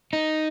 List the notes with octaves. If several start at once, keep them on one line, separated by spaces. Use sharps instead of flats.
D#4